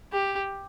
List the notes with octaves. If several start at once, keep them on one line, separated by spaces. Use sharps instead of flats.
G4